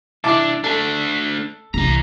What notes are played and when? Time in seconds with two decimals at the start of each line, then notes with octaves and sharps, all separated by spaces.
0.24 C2 D4 E4 A5 D6
0.64 A3 D4 A4
1.74 C2 E3 A#5